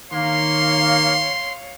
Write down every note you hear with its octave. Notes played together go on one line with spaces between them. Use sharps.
D#3 A#3 C#5 F5 C6